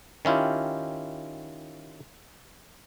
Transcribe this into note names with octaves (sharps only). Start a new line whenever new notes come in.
D#3 C#4 E4 F4 G4